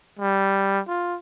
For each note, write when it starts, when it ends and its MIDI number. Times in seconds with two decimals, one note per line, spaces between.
0.19 0.80 55
0.88 1.17 65